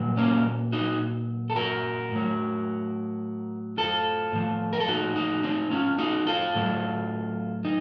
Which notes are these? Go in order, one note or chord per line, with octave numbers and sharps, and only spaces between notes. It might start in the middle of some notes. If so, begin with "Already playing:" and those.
Already playing: A#2 F#3
A#3 C#4
D#4 F#4
A4
F#4 A#4
A2 F#3
F4 A4
A2 F3
A#4
A4
D#4 F#4
D#4 F#4
C4 D#4
C#4 F4
D#4 F#4
F4 A4
A2 F#3
D#4